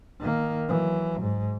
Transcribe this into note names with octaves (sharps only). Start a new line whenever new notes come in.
D#3 A#3
E3 F#3
G#2